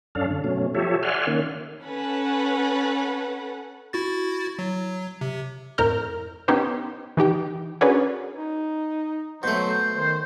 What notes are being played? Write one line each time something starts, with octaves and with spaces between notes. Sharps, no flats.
F#2 C#4 D4 A4 F5
D3
B2 F#3 A3 C#4
F3 G4 A4 C#5 E5
D5 E5 F#5 G#5 C6 F6
D#3 A#3 C#4
C#4 A4 B4 F#5
E4 F#4 A6
F#3
C3
F2 A2 A#4 A#5 F6 G6
B3 C#4 D#4 G4 C5
E3 D#4 G4 G5
C#4 D4 F#4 G#4 A#4 B4
D#4
B2 F#3 A3 C5
D#3 C5